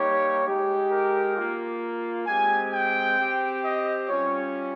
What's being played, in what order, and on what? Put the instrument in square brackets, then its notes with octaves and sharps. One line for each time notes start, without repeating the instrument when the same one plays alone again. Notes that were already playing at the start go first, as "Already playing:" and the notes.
Already playing: [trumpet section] G3 A#3 D#4 G4 C#5
G#3 D#4 G4
A#4
A#3 F4
G#3 C4 G4 G#5
G5
C4 G4
D#5
G3 C#4 F4 C#5